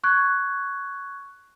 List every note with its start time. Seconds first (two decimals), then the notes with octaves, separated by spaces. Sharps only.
0.04 C#6 F#6 G#6